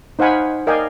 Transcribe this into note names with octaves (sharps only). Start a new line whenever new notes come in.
D#4 C5 F5 F#5 G#5 B5
A#4 D5 D#5 F5 G5 G#5